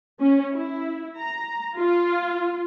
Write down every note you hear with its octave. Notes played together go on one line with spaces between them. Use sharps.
C#4
E4
A#5
F4